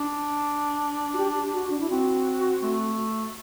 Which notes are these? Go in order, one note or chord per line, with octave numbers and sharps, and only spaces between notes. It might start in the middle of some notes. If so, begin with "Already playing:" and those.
Already playing: D4
F#4
G4
F#4
D4
E4
C4 F#4
A3